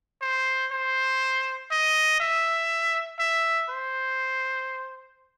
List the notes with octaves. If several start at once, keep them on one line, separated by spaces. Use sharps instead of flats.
C5
C5
D#5
E5
E5
C5